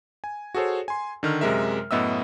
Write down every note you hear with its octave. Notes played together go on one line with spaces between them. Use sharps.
G#5
F#4 G#4 A4 C5 C#5
G#5 C6
D3 D#3 F6
F#2 C3 G#3 A#4 E5
F#2 A2 B3 D#5 E5 E6